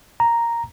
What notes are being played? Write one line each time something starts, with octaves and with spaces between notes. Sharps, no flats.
A#5